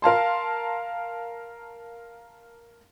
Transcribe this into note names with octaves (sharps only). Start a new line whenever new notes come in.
A#4 F5 A5 C6